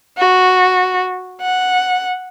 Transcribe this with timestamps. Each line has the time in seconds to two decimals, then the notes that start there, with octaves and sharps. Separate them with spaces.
0.18 F#4
1.41 F#5